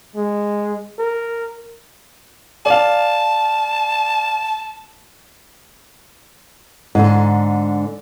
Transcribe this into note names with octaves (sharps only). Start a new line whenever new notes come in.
G#3
A#4
D5 F5 A5
G#2 D3